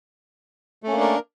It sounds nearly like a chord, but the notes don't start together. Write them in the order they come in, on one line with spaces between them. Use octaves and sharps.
A3 C#4 A#3 D4 A#4